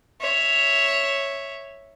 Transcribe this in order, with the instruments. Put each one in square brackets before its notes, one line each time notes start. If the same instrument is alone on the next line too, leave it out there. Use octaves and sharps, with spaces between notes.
[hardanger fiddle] C#5 E5